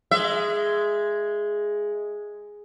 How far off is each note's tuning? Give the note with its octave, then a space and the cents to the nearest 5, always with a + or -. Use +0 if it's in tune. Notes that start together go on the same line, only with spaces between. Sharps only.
G#3 +0 E5 +20